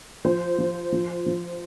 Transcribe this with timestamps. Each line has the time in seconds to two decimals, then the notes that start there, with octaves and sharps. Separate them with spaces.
0.25 F3 C5
0.58 F3
0.92 F3
1.26 F3